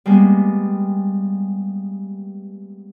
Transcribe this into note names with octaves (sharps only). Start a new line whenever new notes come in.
G3 G#3 A#3 B3